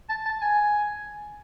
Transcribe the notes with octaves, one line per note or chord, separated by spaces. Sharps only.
A5
A5
G#5